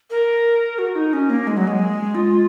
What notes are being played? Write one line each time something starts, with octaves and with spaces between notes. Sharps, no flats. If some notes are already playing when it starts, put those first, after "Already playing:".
A#4
F#4
D#4
C#4
A#3
G#3
F#3
G#3
F4